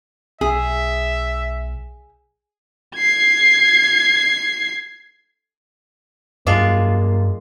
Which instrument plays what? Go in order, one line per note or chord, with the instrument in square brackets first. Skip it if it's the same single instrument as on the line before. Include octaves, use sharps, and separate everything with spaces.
[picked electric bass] B1 [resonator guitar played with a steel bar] G#4 [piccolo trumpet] E5
[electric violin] G#6 C7
[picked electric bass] G2 F#3 [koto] G#3 D4 F4 [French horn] A#3